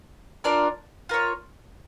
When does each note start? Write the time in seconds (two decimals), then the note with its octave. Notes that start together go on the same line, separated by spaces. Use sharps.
0.44 D4 F4 A#4 D5
1.09 F4 A#4 C#5